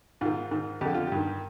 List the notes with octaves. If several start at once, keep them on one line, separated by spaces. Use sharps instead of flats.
G#2 D#3 F4
G#2 D#3
F2 D3 G4
F4
G4
G2 D#3